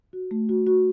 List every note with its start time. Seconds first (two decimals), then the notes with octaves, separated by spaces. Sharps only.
0.13 F#4
0.31 A3
0.49 F#4
0.67 F#4